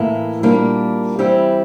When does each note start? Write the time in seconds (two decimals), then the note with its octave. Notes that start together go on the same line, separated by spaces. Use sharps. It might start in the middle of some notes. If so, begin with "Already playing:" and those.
Already playing: A2 E3 A#3 E4
0.43 A#2 G3 A#3 D4
1.19 E3 G3 C4 E4 G4